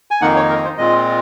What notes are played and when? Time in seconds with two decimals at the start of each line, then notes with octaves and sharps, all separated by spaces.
0.11 G#5
0.21 F2 D#3 A#3 D#4 F#5
0.36 C#5
0.50 A#4
0.64 C5
0.78 A#2 G#3 C4 F4 D#5